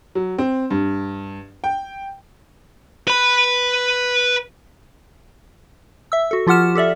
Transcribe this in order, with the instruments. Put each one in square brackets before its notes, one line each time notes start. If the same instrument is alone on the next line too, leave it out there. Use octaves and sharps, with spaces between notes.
[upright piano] F#3
C4
G2
G5
[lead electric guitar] B4 B5
[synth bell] E5 E6
F#4 A4
F3 F4 G4 F#5 F6 E7
G4 A4 D5 E5